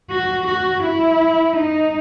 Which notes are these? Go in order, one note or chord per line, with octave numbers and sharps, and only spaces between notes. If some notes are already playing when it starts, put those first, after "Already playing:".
F#4
F#4
E4
D#4